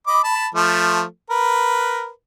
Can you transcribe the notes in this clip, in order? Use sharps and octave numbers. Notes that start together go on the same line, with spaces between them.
D#5 B5 D6
A5 B5
F3 A3
A#4 B4